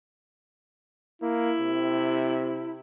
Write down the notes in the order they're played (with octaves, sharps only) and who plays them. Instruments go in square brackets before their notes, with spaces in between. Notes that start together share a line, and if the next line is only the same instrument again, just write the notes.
[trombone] A#3 [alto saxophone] E4
[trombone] C3